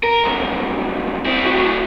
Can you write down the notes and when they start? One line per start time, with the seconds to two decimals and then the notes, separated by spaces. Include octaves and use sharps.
0.03 A#4
0.24 C2 F#2
1.26 C4 E4
1.45 A2 F#3